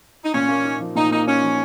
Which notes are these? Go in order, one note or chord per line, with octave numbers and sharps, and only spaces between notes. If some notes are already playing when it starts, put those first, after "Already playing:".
D#4
A#2 C#4
A#3
D#4
F3
A#2 D#4
A#3 D#4
C#4 D#4
F3